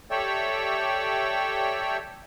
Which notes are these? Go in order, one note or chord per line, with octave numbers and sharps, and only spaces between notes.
G4 A4 C#5 D5 E5 G5